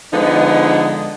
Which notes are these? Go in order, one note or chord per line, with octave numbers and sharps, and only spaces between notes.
D3 F3 G#3 B3 D#4